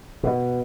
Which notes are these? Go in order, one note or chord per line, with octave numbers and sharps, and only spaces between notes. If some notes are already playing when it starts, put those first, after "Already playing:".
B2